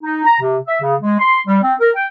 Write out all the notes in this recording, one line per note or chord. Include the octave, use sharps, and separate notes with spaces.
D#4
A#5
C3
E5
C#3
G#3
C6
G3
C4
A#4
G5